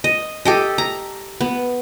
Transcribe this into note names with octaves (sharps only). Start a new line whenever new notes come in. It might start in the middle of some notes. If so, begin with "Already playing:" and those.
D#5
G4 A4 D#5
A#5
B3